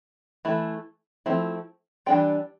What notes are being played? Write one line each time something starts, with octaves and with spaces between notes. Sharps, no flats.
E3 A3 E4
F3 A3 C4 E4
E3 G3 D4 F4 G5